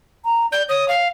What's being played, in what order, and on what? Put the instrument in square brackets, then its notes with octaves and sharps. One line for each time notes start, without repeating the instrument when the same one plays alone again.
[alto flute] A#5
[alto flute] D5 [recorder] G6
[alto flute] C#5 [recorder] D#6
[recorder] F5